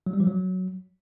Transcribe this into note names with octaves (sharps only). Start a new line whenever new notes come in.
F#3
G3
F3
F#3